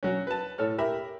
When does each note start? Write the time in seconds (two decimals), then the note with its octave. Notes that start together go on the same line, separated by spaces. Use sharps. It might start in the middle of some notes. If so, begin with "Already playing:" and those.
0.03 F#3 C#4
0.27 B4 A5
0.58 A2 A4 C#5 F6
0.78 G4 A#4 E5 B5